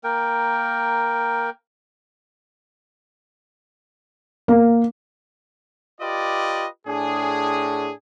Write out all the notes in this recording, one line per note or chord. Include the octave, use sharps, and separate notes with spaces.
A#3 A#4 G5
A#3
F4 G4 B4 D5 D#5
A2 D4 G#4